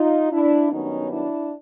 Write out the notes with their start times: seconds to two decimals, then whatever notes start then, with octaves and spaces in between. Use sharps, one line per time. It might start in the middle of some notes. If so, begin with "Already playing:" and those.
Already playing: D#4 F4
0.31 D4 E4
0.70 G2 D#3 F#3 B3 C#4 D#4
1.10 D4 E4